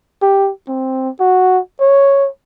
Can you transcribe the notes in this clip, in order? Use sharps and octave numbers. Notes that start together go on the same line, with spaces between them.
G4
C4
F#4
C#5